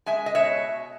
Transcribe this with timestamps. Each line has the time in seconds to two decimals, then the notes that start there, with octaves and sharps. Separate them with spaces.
0.06 G#3 E5 G#5
0.26 D#5
0.35 B2 C#5 E5